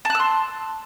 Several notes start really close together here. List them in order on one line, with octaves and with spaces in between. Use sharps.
A5 F#6 E6 C6